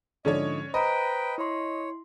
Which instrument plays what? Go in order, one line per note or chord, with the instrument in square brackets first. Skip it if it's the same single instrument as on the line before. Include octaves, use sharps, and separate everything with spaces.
[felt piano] G#2 D3 F3 [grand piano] C#4 D4 C#5 [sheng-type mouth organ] D#5
[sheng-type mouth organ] B4 G5 [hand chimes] C5 A#5 D7 [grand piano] D#5 [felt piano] B5
[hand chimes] E4 C6 [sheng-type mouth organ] C#5